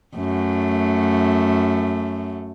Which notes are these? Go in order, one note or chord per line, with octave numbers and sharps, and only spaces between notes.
F#2 A3